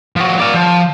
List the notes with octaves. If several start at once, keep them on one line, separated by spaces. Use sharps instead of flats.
F3 F#4
D5 F5
F3